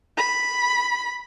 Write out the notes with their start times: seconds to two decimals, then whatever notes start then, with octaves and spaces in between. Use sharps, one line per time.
0.17 B5